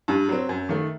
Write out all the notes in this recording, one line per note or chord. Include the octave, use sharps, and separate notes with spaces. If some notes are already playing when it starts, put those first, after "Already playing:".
G2
F#3 C4
F#2
D#3 A3